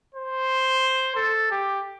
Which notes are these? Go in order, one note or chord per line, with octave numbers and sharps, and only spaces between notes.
C5
A4
G4